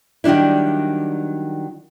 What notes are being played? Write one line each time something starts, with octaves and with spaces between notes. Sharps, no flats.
D#3 F#3 G3 D4 E4